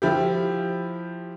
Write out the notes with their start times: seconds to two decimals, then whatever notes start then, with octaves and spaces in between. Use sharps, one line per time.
0.02 F3 E4 G4